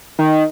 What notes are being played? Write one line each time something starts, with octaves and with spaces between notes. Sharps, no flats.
D#3